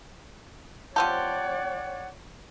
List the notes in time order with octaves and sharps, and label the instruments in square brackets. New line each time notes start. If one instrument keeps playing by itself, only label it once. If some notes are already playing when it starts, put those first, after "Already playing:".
[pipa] F3 C4 G4 [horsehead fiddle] C#5 D5 [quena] F#5 [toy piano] A5